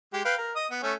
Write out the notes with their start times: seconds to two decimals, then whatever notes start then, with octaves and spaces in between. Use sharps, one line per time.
0.13 G#3 G4
0.25 B4 F5 G5
0.38 A#4
0.56 D#5 D#6
0.71 B3
0.83 A3 C#4